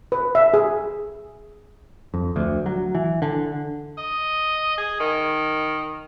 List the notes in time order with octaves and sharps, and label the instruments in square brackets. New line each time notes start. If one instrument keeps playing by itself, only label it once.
[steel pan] B4
E5
G#4
[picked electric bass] F2
D2
F#3
E3
D3
[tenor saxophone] D#5
G#4
D#3